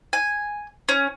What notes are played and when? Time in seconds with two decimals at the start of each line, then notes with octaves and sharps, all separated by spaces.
0.13 G#5
0.89 C#4